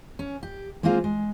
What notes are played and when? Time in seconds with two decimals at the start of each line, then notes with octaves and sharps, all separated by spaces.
0.19 C#4
0.43 G4
0.83 G#3 A#3 C4 E4 F4 G#4
1.04 G#3